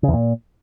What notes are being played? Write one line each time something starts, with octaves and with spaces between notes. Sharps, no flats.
C#3
E2
A#2